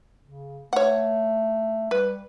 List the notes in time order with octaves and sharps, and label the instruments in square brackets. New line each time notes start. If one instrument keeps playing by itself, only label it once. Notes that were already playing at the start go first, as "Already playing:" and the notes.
[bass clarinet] C#3
[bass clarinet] A3 [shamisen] C#5 F#5
[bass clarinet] G3 [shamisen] B4